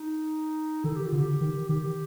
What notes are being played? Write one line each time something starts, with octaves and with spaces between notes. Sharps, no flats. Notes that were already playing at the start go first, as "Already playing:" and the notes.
Already playing: D#4
D#3 A4
G4
F4
D3
G4
D#3
D#3 G4